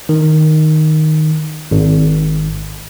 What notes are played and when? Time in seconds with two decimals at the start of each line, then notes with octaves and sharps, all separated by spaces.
0.09 D#3
1.71 G#1